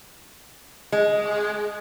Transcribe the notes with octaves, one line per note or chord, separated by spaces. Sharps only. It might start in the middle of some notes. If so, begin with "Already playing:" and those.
G#3